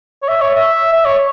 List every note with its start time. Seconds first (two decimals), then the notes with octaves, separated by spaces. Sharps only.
0.23 C#5
0.28 E5
0.41 C#5
0.55 E5
0.92 E5
1.05 C#5